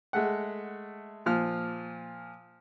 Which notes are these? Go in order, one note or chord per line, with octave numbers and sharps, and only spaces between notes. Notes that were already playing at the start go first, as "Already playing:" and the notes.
G#3 A3 F#5
A#2 F3 F6